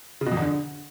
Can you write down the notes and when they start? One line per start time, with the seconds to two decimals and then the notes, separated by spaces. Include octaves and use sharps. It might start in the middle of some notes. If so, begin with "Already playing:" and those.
0.21 C#3
0.26 B2
0.32 F2
0.37 E2
0.42 D3